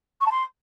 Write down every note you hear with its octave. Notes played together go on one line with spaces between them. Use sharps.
C#6
A5
C6